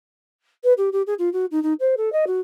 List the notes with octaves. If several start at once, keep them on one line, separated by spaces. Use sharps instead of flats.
B4
G4
G4
G#4
F4
F#4
D#4
D#4
C5
A4
D#5
F#4